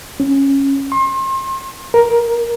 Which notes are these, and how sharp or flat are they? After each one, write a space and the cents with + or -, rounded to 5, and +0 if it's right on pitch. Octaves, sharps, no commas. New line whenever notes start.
C#4 -10
C6 +35
A#4 +10